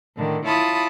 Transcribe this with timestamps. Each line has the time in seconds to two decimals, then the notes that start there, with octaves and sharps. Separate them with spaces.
0.16 A2 D3 D#3
0.45 E4 F4 C#5 A5 B5 D#6